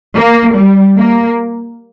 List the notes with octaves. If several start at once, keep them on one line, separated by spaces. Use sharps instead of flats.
A#3
G3
A#3